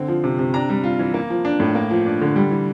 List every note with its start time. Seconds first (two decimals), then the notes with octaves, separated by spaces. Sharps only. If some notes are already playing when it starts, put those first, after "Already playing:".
Already playing: D3 C4
0.08 F3
0.24 C3
0.39 C3
0.54 D4 A#5
0.69 G3
0.84 F4
0.99 E3
1.14 A#3
1.30 F3
1.45 D4
1.60 A2
1.75 A#3
1.91 F3
2.06 D4
2.21 D3
2.36 G3
2.51 E3